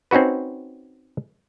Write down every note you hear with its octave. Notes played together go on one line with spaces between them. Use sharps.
C4 C#4 D#4 F#4 B4